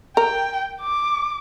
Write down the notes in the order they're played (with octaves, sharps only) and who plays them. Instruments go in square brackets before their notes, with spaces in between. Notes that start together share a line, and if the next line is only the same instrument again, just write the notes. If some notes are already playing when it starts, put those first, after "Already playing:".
[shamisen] A#4 [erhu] G5
[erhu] D6